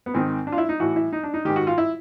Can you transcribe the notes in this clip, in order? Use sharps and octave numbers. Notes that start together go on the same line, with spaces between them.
B3
G#2 D#3 C4
D4
F4
E4
D#4
A2 E3 F#4
E4
D#4
D4
D#4
G#2 D#3 G4
F#4
F4
E4